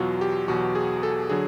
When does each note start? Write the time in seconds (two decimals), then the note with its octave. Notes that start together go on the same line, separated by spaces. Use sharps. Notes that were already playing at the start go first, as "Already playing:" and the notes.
Already playing: E2 B2 F#3 F4 F#4
0.21 G4
0.48 E2 B2 F#3 F#4
0.75 G#4
1.03 A4
1.30 D3 F#3 G#4